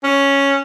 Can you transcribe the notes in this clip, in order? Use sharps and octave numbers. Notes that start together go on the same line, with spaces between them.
C#4